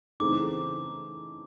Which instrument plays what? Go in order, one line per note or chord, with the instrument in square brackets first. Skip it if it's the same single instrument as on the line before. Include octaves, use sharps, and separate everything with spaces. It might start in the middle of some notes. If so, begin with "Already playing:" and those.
[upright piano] C#3 E3 A3 C4 D#4 [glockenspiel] D6